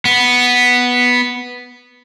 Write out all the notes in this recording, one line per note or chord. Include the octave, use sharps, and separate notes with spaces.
B3